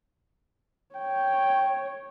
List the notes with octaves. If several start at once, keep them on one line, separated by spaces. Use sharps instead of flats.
C#5 G5